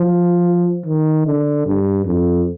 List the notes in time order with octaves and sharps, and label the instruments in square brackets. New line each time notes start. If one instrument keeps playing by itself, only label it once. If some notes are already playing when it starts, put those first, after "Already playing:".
Already playing: [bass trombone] F3
D#3
D3
G2
F2